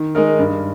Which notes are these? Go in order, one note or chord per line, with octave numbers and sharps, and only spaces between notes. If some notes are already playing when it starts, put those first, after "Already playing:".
Already playing: D#3
G#3 D#4 A#4
G2